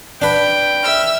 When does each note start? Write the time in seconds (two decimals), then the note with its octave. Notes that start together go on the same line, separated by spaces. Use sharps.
0.22 D4 B4 G5
0.82 E5 E6 F6